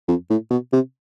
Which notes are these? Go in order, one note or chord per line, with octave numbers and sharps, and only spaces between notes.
F2
A2
B2
C3